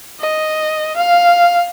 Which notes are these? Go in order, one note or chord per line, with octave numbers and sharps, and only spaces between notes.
D#5
F5